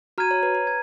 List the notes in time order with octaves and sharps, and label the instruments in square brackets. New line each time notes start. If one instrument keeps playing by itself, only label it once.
[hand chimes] F#4 [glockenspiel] A#5 F6 G#6 D#7
[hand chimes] C#5
B4
B4
[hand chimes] B4 [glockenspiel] G#6